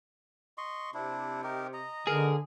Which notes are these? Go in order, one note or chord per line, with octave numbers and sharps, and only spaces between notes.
D#5 C6 C#6
C3 D4 E4
D#4 G4 A#4
D#5 A#5
G#2 B2 D3 G#4 A#4